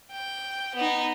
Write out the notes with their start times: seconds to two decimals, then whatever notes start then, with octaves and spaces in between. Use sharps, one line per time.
0.12 G5
0.75 B3 D#4